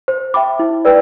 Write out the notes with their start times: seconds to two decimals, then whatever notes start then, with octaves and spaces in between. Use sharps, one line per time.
0.08 C5
0.34 E5 G5 B5 D6
0.59 E4
0.85 B4 D5 G5